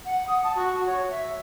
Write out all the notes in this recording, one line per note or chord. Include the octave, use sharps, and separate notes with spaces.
F#5
D#6
A5
F#4
C#5
E5